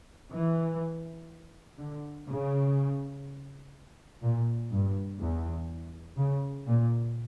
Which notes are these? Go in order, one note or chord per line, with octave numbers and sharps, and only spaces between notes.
E3
D3
C#3
A#2
G2
E2
C#3
A#2